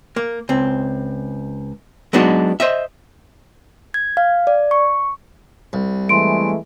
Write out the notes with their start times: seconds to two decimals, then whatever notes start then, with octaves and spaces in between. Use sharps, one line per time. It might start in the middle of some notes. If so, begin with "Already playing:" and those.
0.16 A#3
0.49 C#2 C4
2.13 F#3 G#3 B3 D4 D#4 F#4
2.60 C5 D#5 E5
3.94 G#6
4.17 F5
4.47 D5
4.71 C#6
5.73 C2
6.09 E3 G#3 A3 C6 D7